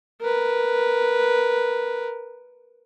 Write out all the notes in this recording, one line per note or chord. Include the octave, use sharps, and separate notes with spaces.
A#4 B4